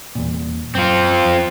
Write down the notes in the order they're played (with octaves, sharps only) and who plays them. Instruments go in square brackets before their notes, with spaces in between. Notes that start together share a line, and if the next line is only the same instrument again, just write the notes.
[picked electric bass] E2 A#2
[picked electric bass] F#2 [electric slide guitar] C4 F4
[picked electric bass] F2